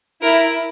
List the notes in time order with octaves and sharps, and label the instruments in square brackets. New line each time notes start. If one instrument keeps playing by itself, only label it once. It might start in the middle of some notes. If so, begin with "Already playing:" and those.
[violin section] E4 [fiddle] A#4